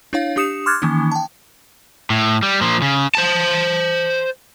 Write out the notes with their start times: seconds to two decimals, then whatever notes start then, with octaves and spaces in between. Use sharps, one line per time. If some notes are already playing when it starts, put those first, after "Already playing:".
0.13 D4 E4 C#5 F5
0.36 D4 G4 D#6 C#7 E7
0.66 C6 D6 F6 F#6 G#6 A6
0.82 D#3 E3 A#3 C#4 D#4
1.12 G5 A5
2.10 A2
2.43 G3
2.61 A#2 F3
2.82 C#3
3.15 C5 A5